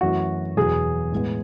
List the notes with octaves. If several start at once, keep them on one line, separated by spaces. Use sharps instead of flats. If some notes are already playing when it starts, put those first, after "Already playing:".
F#2 E3 A3 F#4
E2 B2 F#3 G#4
A2 G#3 B3